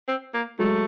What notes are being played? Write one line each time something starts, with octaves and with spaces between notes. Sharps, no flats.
C4
A#3
F#3 G#3 A3